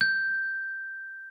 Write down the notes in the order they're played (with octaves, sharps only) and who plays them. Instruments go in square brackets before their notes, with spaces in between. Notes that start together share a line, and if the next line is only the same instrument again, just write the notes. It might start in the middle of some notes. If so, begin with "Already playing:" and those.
[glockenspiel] G6